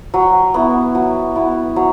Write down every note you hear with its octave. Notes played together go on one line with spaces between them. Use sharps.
F#3
B3 E4
F#3
B3 E4
F#3